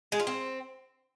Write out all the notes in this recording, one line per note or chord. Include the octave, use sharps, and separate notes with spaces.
G#3
F4
C4